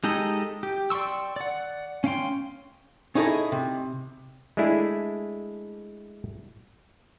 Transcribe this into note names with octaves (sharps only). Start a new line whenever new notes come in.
G#3 D#4 G4 A4 D#5
G4
D5 G5 C6 C#6 E6
D5 F#5
C#4 F5 G5 C6
C#4 D#4 E4 G#4 A4 D#5
C3
G#3 A3 D4 E4 G#4